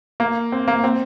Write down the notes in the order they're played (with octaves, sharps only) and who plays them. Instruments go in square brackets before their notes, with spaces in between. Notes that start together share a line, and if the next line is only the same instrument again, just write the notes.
[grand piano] A#3
C4
A#3
C4